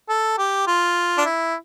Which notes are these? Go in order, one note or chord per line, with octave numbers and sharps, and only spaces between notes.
A4
G4
F4
D4
E4